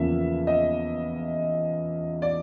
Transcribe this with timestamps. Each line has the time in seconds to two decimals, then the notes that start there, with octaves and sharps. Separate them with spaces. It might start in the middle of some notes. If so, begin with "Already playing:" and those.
Already playing: E2 C#3 F3 A#3 E5
0.47 D#5
2.22 D5